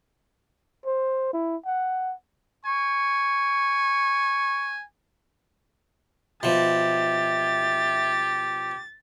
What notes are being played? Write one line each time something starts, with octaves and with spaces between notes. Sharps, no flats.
C5
E4
F#5
G#5 C#6
B2 F3 G4 E5 A6